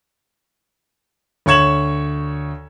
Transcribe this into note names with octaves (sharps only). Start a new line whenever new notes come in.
D2 C#5 C#6 G#6 E7 F#7